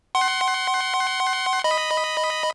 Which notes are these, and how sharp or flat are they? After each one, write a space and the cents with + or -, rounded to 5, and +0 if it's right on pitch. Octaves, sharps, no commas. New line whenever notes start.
F#5 +25 C6 +15
D#5 +0 B5 +0